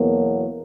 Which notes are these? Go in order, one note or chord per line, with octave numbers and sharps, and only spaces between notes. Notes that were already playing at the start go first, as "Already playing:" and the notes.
Already playing: E2 B2 F#3 A#3